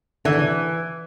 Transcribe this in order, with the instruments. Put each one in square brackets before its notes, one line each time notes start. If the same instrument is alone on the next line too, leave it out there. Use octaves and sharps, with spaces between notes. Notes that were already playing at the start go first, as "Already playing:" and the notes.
[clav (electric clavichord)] D3 [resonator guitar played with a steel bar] E3